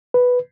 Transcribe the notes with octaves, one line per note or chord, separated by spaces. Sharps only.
B4